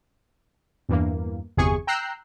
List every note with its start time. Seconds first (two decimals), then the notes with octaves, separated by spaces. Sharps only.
0.89 E2 G2 E3 A#3
1.57 G1 E2 C3 G#4 G#5 C#6
1.87 G5 A#5 E6 F#6 G6 C7